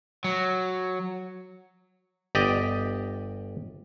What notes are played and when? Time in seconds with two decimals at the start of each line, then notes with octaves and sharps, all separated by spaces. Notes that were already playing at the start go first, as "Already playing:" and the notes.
0.24 F#3
2.35 G1 G4 D5 D#5